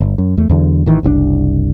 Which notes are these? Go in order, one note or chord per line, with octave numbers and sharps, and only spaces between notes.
G1
F#2
E2 A3
E2 D3 F#3
A1 D#3 E3
F#1 C2 C4 D4